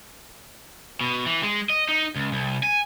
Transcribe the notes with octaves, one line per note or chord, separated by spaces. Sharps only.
B2
E3
G#3
D#5
D#4
C#2
C2
G#5